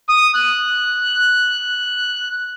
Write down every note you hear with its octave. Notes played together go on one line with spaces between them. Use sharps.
D#6
F#6